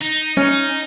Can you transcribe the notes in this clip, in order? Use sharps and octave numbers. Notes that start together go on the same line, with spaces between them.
D#4
C#4